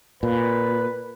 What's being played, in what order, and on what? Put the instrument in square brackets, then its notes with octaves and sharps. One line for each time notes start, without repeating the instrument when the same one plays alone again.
[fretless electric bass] A#2 [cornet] B4